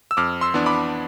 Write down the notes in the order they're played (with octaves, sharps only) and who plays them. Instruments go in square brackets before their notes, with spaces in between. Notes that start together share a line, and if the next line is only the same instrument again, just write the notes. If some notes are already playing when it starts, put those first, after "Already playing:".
[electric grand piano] E6
F2 D6 F6
C6 E6
E3 B3 D4
B5 D6